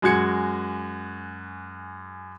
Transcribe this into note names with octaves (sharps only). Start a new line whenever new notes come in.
F#2 G#3 F#4 G#6 C#7